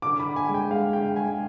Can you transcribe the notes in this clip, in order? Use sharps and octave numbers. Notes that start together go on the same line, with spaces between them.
D3 D6
B5
D3
G#5
G#3
G5
G#3 F5
D3 G5
G#3 G#5